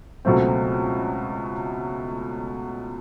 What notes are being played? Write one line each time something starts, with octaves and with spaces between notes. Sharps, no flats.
C#2 B2 F#3 A3 C4